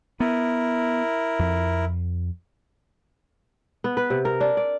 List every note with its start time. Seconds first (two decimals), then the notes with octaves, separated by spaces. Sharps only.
0.20 B3 E4 A#4
1.39 F2
3.84 B3
3.97 B4
4.10 C3
4.25 A#4
4.40 D4
4.57 D5